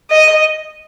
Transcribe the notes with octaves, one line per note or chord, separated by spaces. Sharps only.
D#5